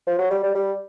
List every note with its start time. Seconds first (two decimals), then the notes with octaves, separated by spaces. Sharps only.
0.07 F3
0.19 F#3
0.30 G3
0.44 G3
0.55 G3